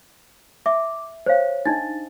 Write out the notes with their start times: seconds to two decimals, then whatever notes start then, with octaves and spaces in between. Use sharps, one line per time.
0.66 E5 D6
1.26 C5 C#5 F5
1.66 D4 D#4 D#5 A6